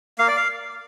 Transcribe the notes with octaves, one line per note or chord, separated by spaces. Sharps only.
A#3 F5
D5
F5